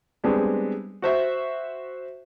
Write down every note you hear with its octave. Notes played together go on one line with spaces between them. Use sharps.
G3 G#3 B3 C4 D4
F#4 C5 E5